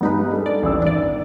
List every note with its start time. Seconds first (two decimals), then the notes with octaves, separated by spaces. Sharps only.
0.01 G2 G3 G#3 B3 D#4 B4
0.32 D4 A4
0.46 D5
0.63 A1 E6
0.82 G1 D#3 D4 D5